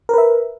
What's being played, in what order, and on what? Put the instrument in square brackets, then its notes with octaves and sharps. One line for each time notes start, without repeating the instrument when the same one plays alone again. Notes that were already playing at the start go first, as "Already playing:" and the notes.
[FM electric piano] A#4
B4
E5